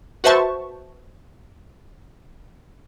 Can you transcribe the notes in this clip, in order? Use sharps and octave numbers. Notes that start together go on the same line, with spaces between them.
F#4 B4 C5 E5 A5 C#6